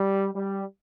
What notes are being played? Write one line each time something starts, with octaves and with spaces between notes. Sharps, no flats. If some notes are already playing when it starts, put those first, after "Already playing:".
Already playing: G3
G3